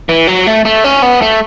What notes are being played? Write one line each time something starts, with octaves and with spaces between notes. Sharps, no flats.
E3
F#3
A3
A3
C#4
B3
A3